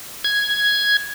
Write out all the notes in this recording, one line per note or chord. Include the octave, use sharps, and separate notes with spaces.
G#6